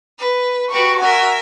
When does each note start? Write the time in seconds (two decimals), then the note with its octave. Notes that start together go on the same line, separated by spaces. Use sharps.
0.18 B4
0.70 F#4 G4 B4 C#6
1.00 F#4 A#4 E5 G#5